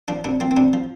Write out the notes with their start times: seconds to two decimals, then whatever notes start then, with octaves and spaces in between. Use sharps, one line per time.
0.08 F3 D4
0.24 C3 D4
0.40 F3 C4
0.51 C4
0.57 C3 D4
0.73 F3